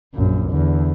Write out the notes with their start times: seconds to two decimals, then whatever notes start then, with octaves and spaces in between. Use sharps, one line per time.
0.15 A#1 F#2
0.51 E2 D3